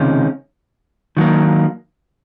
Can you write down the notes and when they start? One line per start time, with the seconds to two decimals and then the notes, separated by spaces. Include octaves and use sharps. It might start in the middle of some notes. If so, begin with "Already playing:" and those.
Already playing: C#2 C3 D#3 G#3 C#4
1.17 D#3 F#3 A#3